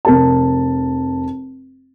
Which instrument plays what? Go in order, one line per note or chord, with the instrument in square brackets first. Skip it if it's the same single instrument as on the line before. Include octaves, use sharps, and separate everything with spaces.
[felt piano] F1 A#4 A5